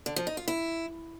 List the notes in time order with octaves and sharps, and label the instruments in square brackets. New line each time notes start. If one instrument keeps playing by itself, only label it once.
[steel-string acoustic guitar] D3
F3
D#4
F4
E4